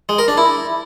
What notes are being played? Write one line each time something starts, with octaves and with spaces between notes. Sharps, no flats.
G#3
A#4
D4
E4